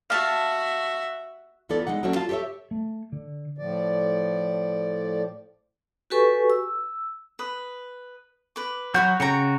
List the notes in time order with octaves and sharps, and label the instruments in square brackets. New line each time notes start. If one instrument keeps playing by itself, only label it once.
[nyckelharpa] F#4 E5 [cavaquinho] F5 A5
[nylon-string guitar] D2 E3 B3 F4 A4 D5
E2 G#3 D#4 F#5
F#3 A3 A#3 C#4 D4 F#4
F4 F5 A5
G4 A4 C5 C#5 E5
[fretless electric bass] A3
D3
[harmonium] A2 F3 D5
[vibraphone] F#4 G4 A4 B4 G#5 C#6
E6
[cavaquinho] B4 D#6
B4 D6
[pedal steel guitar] F#3 G6 [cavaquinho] F#4 C#5 B5
[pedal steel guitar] C#3 F#4 [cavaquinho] C#5 G5 A#5